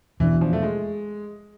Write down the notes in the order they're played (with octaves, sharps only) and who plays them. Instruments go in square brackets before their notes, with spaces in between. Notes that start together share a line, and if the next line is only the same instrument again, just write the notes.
[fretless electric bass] E2 B2 B3 D4 [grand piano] E3
[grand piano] F3
A3
G#3